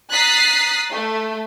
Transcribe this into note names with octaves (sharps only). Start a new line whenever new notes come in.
A#5 D#6 F#6 A6 B6 C7
A3